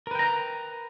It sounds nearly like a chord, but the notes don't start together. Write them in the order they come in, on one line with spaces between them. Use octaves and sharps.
A#4 B4 G5 A#5